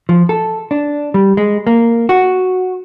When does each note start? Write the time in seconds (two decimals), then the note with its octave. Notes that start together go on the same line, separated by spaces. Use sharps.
0.09 F3
0.29 A4
0.71 D4
1.14 G3
1.37 G#3
1.67 A#3
2.09 F#4